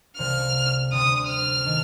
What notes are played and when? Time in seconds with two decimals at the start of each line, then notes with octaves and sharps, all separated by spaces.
0.18 C2 C3 F3 A3 F6
0.92 D2 C3 G3 C4 D#6
1.28 F6
1.66 D#3 A3 D#4